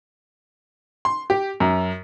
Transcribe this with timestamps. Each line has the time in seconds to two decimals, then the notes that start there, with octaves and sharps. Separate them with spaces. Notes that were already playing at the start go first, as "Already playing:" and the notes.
1.05 C6
1.30 G4
1.60 F#2